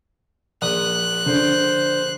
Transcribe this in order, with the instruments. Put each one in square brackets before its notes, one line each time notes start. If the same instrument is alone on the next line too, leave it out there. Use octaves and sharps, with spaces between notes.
[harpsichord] A#1 D#6 [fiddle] F#6
[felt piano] D3 [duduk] C5